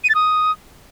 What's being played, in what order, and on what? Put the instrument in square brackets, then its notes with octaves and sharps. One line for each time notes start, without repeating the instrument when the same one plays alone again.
[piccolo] D#7
A6
D#6